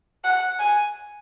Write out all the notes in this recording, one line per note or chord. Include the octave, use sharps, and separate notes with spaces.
F#5
G#5